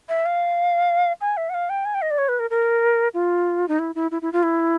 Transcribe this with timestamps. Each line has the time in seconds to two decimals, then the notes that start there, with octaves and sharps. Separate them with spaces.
0.09 E5
0.26 F5
1.21 G#5
1.37 E5
1.50 F#5
1.54 F5
1.70 G5
1.85 G#5
1.95 G5
2.02 D#5
2.11 D5
2.18 C#5
2.29 B4
2.39 A#4
2.50 A#4
3.14 F4
3.68 D#4
3.79 E4
3.95 E4
4.11 E4
4.22 E4
4.33 F4
4.43 E4